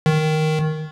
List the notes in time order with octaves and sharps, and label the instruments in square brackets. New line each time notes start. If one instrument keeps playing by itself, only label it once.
[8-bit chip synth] D#3